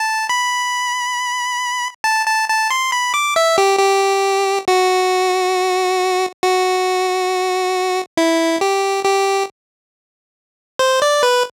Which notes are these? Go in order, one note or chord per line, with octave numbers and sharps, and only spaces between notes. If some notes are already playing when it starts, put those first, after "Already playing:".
Already playing: A5
B5
A5
A5
A5
C6
B5
D6
E5
G4
G4
F#4
F#4
E4
G4
G4
C5
D5
B4